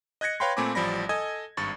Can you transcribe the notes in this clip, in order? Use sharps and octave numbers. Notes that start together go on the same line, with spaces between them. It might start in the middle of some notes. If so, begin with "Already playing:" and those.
D#5 F#6 G#6 A#6 C#7
B4 C#5 F5 G5 B5 C6
A#2 A3 C4 G#5 B5 D6
A1 F3 G3 D5 B5 A#6
A4 D#5 G#5 D#6 G#6
G#1 G2 C#6 A6